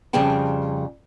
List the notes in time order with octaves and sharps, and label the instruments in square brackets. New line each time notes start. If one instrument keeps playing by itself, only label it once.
[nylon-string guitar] F2 C#3 G3 G#4 G5 A5